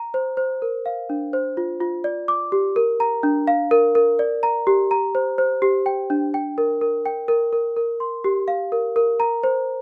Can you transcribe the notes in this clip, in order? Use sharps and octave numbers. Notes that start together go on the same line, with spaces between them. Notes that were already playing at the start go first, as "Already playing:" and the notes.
Already playing: A#5
C5
C5
A#4
F5
D4
C5
F4
F4
D5
D6
G4
A#4
A#5
D4
F5
A#4
A#4
D5
A#5
G4
A#5
C5
C5
G4
G5
D4
G5
A#4
A#4
G5
A#4
A#4
A#4
C6
G4
F5
A#4
A#4
A#5
C5